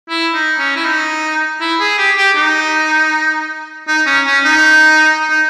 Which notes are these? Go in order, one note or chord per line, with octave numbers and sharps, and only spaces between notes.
E4
D#4
C#4
E4
D#4
E4
G#4
G4
G4
D#4
D#4
C#4
C#4
D#4
D#4